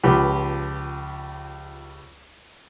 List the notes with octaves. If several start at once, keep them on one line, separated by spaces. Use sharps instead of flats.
C#2 F3 G4 B4